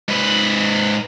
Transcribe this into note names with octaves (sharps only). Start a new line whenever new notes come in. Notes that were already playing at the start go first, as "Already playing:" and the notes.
G#2 B4